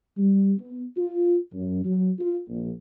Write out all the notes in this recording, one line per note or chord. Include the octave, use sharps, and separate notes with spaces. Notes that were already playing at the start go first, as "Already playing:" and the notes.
G3
B3
F4
F#2
F#3
F4
A#1